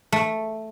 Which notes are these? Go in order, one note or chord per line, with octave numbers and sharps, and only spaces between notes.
A3